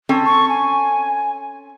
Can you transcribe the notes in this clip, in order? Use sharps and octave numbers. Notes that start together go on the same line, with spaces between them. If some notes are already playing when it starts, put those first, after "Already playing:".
C4 C#4 A4
C#6
G#5